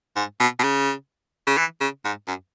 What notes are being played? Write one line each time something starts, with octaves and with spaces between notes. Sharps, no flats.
G#2
B2
B2
C#3
C#3
E3
C#3
G#2
F#2